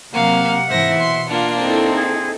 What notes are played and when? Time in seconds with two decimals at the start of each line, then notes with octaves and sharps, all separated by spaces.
0.14 C3 F#3 A#3 F5 F#5
0.70 G#2 E3 C5 E5 A#6
1.00 B2 C6
1.30 A#3 D4 F4
1.60 C4 D#4 E4 A4
1.95 G#4